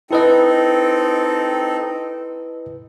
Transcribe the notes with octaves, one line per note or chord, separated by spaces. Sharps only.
C4 D#4 E4 A4 B4 D#5